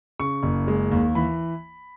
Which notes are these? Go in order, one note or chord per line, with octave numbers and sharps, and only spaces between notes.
C#3 C#6
F#1
G#3
D#2
E3 B5